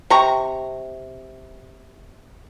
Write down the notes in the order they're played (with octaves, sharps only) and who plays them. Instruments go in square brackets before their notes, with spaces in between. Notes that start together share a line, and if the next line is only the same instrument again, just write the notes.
[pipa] C3 A#5 C#6